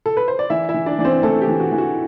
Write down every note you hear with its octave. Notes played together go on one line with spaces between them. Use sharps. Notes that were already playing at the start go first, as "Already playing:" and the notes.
A4
B4
C5
D5
E3 E4 E5
E4 E5
E3
D4 D5
E3 D5
C4 C5
E3 A3 A4
G4
E3
F#4
E3
F#4